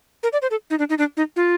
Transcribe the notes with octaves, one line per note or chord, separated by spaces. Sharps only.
A#4
D5
C5
A4
D#4
D4
D#4
D4
D#4
F4